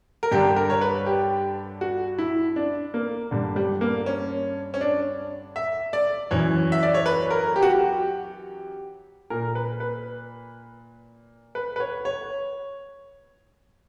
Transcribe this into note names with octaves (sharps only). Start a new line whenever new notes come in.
A#4
G2 D3 G4
A#4
C#5
B4
G4
F#4
E4
D4
A#3
G2 D3
G3
A#3
C#4
C#4
D4
E5
D5
F#2 E3 C#5
E5
D5
C#5
B4
A#4
G4
F#4
G4
A#2 A#4
B4
B4
B4
B4
C#5
C#5